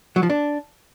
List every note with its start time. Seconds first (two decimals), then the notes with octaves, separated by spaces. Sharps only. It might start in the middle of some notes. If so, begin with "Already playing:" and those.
0.16 F#3
0.23 F3
0.30 D4